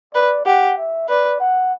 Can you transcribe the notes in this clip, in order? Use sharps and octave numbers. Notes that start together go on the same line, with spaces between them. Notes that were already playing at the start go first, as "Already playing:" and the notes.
B4 D5
G4 F#5
E5
B4 D5
F#5